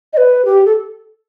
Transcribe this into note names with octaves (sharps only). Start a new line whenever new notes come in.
D#5
B4
G4
A4